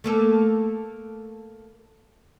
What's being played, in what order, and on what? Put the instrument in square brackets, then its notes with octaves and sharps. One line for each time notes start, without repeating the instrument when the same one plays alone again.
[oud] A3 A#3 A4